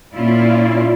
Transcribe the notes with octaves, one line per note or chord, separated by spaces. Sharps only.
A#2 C#4 E4 F4 D5